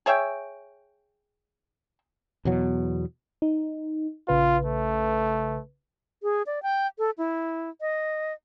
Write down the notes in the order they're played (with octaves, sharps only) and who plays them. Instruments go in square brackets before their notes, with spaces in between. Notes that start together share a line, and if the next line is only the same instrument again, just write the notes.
[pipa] G#4 C#5 E5 G5
[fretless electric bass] E2 B2 F#3
[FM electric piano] D#4
[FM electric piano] A#1 C#3 B4 [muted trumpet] F4
[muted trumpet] A3
[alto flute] G#4
D5
G5
A4
E4
D#5